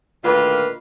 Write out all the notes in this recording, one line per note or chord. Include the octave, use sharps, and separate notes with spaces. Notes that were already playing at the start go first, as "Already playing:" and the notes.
D2 A#2 D#3 A#3 F4 B4